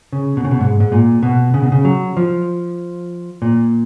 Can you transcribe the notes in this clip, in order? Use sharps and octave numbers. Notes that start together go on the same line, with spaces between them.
C#3
B2
C#3
B2
G#2
G#2
A#2
B2
C#3
B2
C#3
F#3
F3
A#2